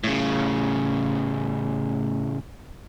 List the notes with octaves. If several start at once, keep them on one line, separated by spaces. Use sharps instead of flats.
A2 C#3